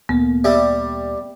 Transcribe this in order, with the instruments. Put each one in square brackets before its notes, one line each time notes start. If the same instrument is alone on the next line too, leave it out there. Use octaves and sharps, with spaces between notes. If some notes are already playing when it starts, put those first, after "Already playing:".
[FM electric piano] D2 A#2 A#3 [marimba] B3
[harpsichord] G3 [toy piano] E5 E6